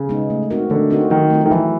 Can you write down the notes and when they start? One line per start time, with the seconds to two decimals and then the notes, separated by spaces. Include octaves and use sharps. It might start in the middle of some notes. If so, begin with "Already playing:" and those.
Already playing: C#3
0.09 G#3 B3 D#4
0.30 A3
0.50 C4 D#4 F#4 A#4
0.70 D3 A3
0.90 C4 D#4 F#4 A#4
1.10 D#3 F#3
1.30 A3 C4 F4
1.46 D#3
1.51 E3 F#3